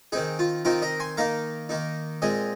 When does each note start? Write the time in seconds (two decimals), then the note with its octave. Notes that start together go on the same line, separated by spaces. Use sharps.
0.12 D#3 C4 D#4 G#4
0.39 F4
0.65 D#3 C4 D#4 F4 A#4
0.82 A#4 D#5
1.00 G#5 C6
1.17 D#3 A#3 D#4 F5 A#5
1.69 D#3 A#3 D#4
2.22 A#2 G#3 C4 D#5 G#5